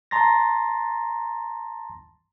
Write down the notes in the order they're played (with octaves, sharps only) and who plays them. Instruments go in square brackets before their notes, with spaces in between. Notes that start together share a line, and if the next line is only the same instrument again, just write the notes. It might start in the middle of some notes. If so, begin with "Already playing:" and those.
[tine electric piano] A5 A#5 C6 A6 A#6